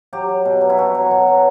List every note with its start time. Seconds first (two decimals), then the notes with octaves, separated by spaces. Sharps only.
0.13 F#3 G4
0.29 F#3
0.45 B2
0.61 F#3
0.69 E4
0.77 B2 F#4
0.94 F#3
1.11 B2
1.27 F#3